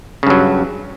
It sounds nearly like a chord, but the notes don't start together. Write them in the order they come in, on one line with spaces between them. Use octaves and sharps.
C#3 G2 F#3